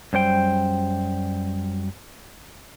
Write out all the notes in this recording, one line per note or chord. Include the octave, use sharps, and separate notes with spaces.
F#2 G3 C5 G5